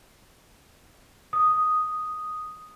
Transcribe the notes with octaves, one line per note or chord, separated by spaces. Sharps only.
D#6